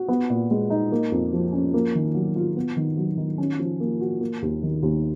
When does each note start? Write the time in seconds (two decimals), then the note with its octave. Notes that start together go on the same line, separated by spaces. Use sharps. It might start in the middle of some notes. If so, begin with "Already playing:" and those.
Already playing: F#4
0.08 B3
0.30 A#2
0.51 G#3
0.70 D#4
0.92 A#3
1.12 F2
1.33 F3
1.53 C#4
1.74 A#3
1.95 D#3
2.14 F#3
2.36 F4
2.56 B3
2.77 D#3
2.97 F#3
3.18 D#3
3.38 C#4
3.59 F3
3.80 A#3
4.01 F#4
4.21 A#3
4.42 D#2
4.63 D#3
4.83 D#2